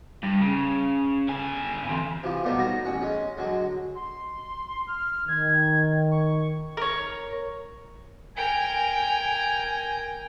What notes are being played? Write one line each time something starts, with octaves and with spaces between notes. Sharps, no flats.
G2
C#3
D3 G#5
E3 C4
C3 E3 F3
B2 F#3 G3 A3 B3 G4
D#4 F#4 A#5
A1 C#4 F#5
G#3 C#4
D3 F#3 G#3
C6
F6
D#3 G#6
C#6
A#4 C#5
A#4 G5 G#5